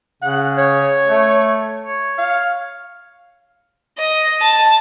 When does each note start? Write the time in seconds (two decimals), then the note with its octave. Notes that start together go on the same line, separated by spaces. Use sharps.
0.22 C#3 F#5
0.58 C#5
1.07 A3
1.83 C#5
2.18 F5
3.98 D#5
4.42 A5